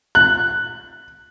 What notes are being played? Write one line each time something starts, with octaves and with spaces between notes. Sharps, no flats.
F#6